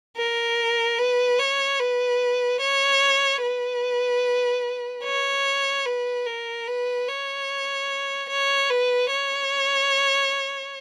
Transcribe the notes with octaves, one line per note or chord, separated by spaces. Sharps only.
A#4
B4
C#5
B4
C#5
B4
C#5
B4
A#4
B4
C#5
C#5
B4
C#5